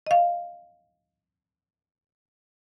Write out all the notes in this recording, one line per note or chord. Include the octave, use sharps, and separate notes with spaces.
D#5 F5